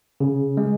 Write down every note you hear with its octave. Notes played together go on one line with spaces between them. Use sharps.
C#3
G#3